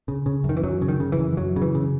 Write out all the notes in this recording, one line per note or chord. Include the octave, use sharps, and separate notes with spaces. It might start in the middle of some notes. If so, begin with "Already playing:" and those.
C#3
C#3
F#2
D#3
E3
F#2 F#3
C#3
D#3
C#3
E3
F#2
F#2 F#3
C#3
E3
C#3